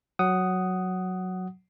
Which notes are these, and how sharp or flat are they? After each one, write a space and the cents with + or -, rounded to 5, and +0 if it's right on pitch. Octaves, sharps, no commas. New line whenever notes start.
F#3 -5 F#5 +10 D#6 +0